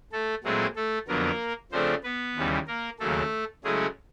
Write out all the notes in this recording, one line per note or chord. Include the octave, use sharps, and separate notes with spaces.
A3 A4
A#2 F#3 G#3 A3 C4 E4 G#4
A3 A4
F2 D3 F#3 A#3 B3 A#4
C#3 F3 A3 C4 D4 C5
B3 B4
D#2 C#3 E3 G3
A#3 A#4
D#2 C#3 F#3 A3 A#3 A4
C#3 F#3 G#3 A3 C#4 E4 G#4